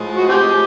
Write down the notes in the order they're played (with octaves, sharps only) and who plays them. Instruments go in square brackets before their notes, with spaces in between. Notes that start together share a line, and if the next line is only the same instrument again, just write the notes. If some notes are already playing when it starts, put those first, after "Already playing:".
Already playing: [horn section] A2 F3 G#3
[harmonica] F#4
C4 G4